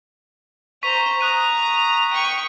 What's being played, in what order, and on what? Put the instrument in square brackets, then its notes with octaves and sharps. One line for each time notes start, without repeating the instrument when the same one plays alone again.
[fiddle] C5 A#5 [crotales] C#6 B6 D#7
[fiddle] A#5 [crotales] D#6 F#6 D#7
[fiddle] G5 C#6 [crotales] D#7